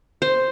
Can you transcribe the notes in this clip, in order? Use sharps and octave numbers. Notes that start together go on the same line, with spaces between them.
C5